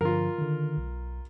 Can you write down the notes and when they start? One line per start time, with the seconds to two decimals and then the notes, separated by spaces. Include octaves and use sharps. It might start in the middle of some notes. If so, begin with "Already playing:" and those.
0.01 G2 D3 F3 F4 A#4
0.38 D3 D#3
0.77 B1